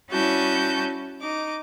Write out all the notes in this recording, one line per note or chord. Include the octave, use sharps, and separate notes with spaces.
G3 C#4 E4 F#4 A5 G6
D#4 D6